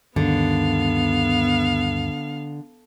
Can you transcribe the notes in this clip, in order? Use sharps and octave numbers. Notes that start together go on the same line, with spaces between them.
D2 G2 D3 D#3 B3 F5